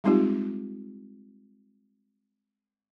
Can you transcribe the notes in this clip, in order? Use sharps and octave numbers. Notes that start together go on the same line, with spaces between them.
G3 G#3 C4 D#4 F4 G4